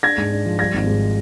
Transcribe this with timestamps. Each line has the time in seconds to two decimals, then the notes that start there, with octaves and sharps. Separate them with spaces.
0.03 D4 G#6 A#6
0.18 G#2
0.31 D4
0.46 F3
0.59 G3 G#6 A#6
0.74 G#1
0.87 G#2